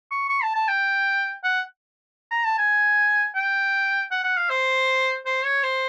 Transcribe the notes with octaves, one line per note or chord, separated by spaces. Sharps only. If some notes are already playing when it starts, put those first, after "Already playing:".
C#6
C#6
A5
A5
G5
F#5
A#5
A5
G#5
G5
F#5
F#5
F5
C5
C5
C#5
C5